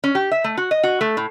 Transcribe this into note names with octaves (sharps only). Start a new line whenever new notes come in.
C#4
G4
E5
A3
F#4
D#5
F#4
A3
A2